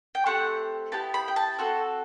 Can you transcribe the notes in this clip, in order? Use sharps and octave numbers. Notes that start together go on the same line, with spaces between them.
G5
A3 C4 G4 F#5
B3 E4 G4 A5
B5
G5
A5
C4 F#4 A4